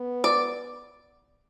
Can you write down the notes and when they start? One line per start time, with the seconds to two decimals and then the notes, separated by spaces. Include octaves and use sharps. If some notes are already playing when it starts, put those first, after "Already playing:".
Already playing: B3
0.24 D5